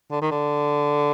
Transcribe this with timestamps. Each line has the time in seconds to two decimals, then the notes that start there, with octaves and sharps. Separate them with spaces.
0.11 D3
0.21 D#3
0.31 D3